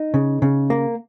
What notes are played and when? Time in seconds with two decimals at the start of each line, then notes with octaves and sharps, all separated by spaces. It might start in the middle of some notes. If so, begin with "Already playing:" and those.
Already playing: D#4
0.14 C#3
0.42 C#3
0.70 A#3